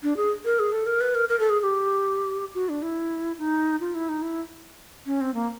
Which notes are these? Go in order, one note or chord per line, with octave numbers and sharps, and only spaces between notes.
D4
G#4
A#4
G#4
A4
A#4
B4
A#4
A#4
A4
G#4
G#4
G4
F#4
D4
E4
D#4
F4
E4
D#4
E4
C#4
C4
A#3